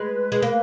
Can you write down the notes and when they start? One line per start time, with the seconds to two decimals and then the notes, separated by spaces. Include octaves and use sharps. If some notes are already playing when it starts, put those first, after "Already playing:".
Already playing: G#3 B4
0.32 G#3
0.42 A#3